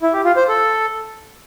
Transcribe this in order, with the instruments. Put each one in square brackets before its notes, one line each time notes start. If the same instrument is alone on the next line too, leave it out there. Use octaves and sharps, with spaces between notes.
[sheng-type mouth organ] E4
G4
F4
C5
A4